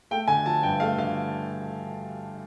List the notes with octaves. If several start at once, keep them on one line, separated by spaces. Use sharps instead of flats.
A3 G5
D3 G#5
F3 A5
G2 G5
A3 F5
D3 F5